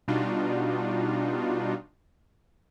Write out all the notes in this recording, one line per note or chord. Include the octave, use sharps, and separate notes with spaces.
B2 G3 D4 D#4 F4 F#4